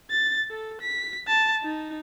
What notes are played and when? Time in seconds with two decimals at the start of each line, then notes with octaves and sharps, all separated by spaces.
0.11 A6
0.51 A4
0.81 B6
1.27 A5
1.63 D#4